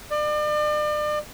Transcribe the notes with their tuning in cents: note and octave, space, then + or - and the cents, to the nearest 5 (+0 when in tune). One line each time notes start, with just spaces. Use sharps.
D5 +40